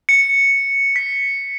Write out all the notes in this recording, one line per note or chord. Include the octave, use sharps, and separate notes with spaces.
C#7
B6